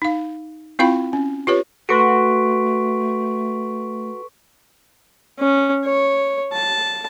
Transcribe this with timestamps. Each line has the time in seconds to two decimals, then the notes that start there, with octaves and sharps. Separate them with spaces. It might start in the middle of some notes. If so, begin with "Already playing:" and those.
0.02 D#4 F5
0.79 C4 E4 F4 F5 G5 B5
1.13 C#4
1.47 F4 G4 B4 C#5
1.89 A3 F#4 A4 B4 C6 C#6 B6 D7
5.39 C#4
5.85 C#5
6.52 A5